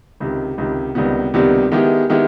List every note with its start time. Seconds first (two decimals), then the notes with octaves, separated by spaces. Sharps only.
0.20 C#2 C3 D#3
0.58 C#2 C3 D#3
0.95 C#2 C3 D#3 G3 B3
1.34 C#2 C3 D#3 G3 B3
1.71 D#3 G#3 B3 E4 G4
2.10 D#3 G#3 B3 E4 G4